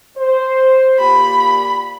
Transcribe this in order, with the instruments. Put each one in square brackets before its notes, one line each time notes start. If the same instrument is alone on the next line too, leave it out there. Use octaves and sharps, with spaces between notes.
[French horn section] C5
[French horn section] A#2 G4 [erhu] B5